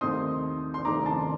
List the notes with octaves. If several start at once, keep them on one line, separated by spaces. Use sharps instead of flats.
D#2 D#3 A3 C4 D#4 C6 D#6
C6
D#2 D#3 A3 C4 D#4 A#5 D6
A5 C6